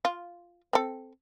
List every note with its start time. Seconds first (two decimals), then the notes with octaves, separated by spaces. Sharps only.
0.05 F4
0.73 C4 A4